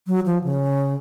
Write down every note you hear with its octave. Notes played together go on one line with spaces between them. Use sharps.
F#3
F3
C#3